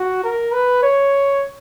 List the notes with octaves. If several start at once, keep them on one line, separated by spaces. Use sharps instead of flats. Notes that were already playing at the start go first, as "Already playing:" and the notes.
Already playing: F#4
A#4
B4
C#5